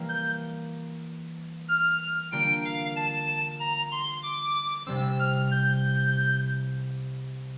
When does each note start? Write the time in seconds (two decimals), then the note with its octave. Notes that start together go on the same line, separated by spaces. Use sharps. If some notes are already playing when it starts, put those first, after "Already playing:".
Already playing: E3 G3 A#3
0.09 G6
1.68 F6
2.32 D3 G3 A#3 F4 G5
2.64 F5
2.96 A5
3.60 A#5
3.91 C6
4.23 D6
4.86 C2 C3 G3 C4 E6
5.19 F6
5.51 G6